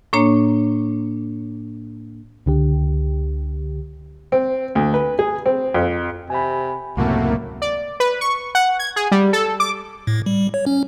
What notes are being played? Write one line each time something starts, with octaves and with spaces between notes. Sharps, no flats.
A2 A#3 D4 C#5 A#5
C#2 D3 G4
C4
D2
B4
G#4
C4
F2
C3 G#5 B5
C#2 F#2 A2 C3 A3 A#3 F#4
D5
B4
C#6
F#5
G#6
G#4
G3
A4
D6
A2
G3
C#5
C#4